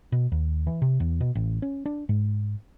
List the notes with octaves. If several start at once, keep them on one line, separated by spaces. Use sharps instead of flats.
B2
D#2
E3
C3
E2
B2
A1
C#4
D4
G#2